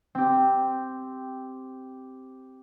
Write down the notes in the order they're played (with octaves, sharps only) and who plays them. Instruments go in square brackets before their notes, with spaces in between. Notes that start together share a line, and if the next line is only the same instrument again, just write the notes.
[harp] C4 G4